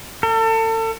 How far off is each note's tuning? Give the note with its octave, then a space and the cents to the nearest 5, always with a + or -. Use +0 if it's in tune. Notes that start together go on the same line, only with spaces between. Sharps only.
A4 +35